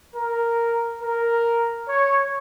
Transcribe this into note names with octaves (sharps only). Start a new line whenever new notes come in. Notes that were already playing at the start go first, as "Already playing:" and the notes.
A#4
A#4
C#5